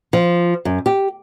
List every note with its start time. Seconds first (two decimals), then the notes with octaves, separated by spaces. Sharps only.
0.13 F3
0.65 F#2
0.86 G4